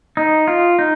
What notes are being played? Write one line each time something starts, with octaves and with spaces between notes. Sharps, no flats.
D#4
F4
D#4